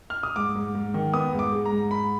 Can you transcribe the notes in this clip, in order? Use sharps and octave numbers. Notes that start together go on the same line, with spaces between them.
F6
D#6
G#2 D6
G#2
G#2
D#3
B3 D#6
G#2
D6
G#3
A#5
G#2
G#2 B5